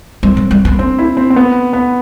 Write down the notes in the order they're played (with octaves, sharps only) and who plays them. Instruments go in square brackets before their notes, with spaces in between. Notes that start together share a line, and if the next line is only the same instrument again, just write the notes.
[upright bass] G3 [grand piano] C4
[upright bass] F#3
G3
B3
[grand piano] C4 [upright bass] D4
[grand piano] E4
C4
C4
B3
B3